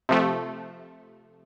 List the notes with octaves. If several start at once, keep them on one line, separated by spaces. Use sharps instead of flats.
C3 F3 A3